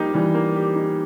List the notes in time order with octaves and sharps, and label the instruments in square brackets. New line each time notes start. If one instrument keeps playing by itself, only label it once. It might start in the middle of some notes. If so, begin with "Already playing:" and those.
Already playing: [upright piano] F3 [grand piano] G3 A#3 D#4 G4
[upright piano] E3 [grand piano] G3
[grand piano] A#3
G4
D#4